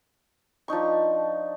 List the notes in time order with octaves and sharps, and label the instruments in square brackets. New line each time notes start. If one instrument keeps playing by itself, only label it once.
[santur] F3 D4 D#4 C#6